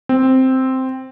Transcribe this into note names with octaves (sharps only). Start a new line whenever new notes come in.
C4